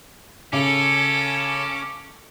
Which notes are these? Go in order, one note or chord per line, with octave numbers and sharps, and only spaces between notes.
C#3 C#4 A4 D6